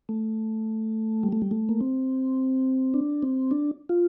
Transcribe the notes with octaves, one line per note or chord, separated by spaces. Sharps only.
A3
G3
A3
G3
A3
A#3
C4
D4
C4
D4
F4